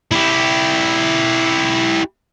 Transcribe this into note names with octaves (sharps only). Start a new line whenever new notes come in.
E4 G4